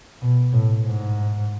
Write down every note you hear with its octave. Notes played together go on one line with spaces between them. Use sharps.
B2
A2
G#2